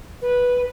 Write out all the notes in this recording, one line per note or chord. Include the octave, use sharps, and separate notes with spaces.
B4